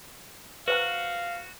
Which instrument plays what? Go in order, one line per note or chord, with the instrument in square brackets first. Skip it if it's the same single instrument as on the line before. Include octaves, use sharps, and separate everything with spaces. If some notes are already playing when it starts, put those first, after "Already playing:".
[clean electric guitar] F#4 [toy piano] B4 C5 A#5 [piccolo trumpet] F5